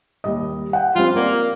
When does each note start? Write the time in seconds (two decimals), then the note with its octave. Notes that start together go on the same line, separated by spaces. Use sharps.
0.24 D#2 G3 D#5
0.73 F#5 G5
0.96 F3 G3 C4 F4
1.16 A#3 C4 D5